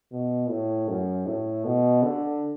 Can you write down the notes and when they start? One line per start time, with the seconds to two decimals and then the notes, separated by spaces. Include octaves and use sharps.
0.12 B2
0.49 A2
0.88 F#2
1.26 A2
1.64 B2
2.03 D3